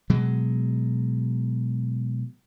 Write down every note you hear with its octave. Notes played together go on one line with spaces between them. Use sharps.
B2 F#3 G#3